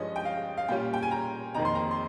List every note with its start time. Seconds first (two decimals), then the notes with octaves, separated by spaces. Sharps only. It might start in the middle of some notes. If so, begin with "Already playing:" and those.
Already playing: G2 F3 G#3 C#4 D#5
0.16 G5
0.25 F5
0.57 F5
0.68 A#2 G3 C#4 F4 G5
0.94 G5
1.03 G#5
1.11 A#5
1.54 F2 D#3 A#3 D#4 A#5
1.65 C6
1.75 A#5
1.91 C6